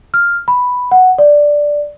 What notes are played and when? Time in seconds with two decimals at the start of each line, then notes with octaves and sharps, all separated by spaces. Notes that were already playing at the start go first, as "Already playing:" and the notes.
0.14 F6
0.48 B5
0.91 F#5
1.18 D5